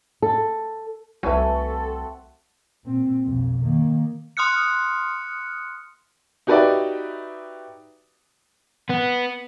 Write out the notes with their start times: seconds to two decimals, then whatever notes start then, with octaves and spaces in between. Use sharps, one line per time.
0.22 A4
1.23 C2 A3 C4 F#4 A4 B4 G#5 A#5
2.84 A#2 C4
3.25 B1 F2
3.62 D#3 A#3
4.37 C6 D#6 F6 F#6 C#7
6.47 D#4 F#4 G4 B4 D5 E5
8.90 B3